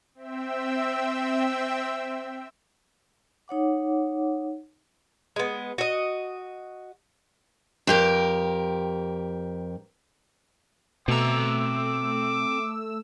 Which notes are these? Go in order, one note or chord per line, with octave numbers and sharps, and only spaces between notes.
C4 E5 G5 E6
D#4 C#5 F#5 D6
G#3 B3
F#4 D#5
F2 G4 A#4
B2 A3 C4 A#5 D6 E6